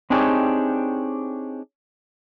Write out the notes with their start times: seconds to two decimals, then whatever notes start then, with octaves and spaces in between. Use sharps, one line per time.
0.10 C4 D4 D#4 G4 G#4 C#5